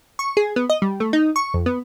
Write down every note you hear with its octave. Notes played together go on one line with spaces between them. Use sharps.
C#6
G#4
B3
D#5
G3
A3
D#4
C#6
F2
B3